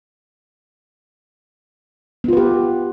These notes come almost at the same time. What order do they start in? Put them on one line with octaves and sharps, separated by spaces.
B3 F4 B4 G4